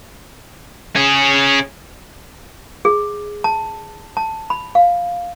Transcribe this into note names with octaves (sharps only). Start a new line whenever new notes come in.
C#4 G#4
G#4
A5
A5
B5
F5